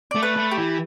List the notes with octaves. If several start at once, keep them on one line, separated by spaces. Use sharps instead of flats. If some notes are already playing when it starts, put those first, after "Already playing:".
A3 D5
B4
A3
G4
E3